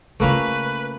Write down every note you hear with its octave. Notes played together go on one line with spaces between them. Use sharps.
C#3 A3 A#3 C#4 F4 B4